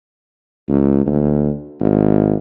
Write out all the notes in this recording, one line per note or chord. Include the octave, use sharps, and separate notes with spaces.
C#2
D2
G#1